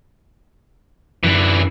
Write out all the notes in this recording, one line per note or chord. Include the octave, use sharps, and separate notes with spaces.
F#2 D3 E3